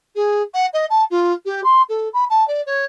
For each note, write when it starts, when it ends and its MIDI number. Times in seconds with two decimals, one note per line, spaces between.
0.15 0.42 68
0.54 0.66 78
0.73 0.85 75
0.90 1.04 81
1.10 1.32 65
1.45 1.61 67
1.64 1.82 84
1.89 2.08 69
2.13 2.24 83
2.30 2.46 81
2.47 2.61 74
2.66 2.85 73